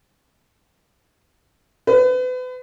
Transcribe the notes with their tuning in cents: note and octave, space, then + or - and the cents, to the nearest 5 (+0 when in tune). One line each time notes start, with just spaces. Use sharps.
B4 +35